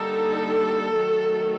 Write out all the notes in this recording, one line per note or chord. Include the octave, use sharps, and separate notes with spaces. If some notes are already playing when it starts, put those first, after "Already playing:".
Already playing: D3 G3 A#3 D#4 A4
D#3 F#3 A3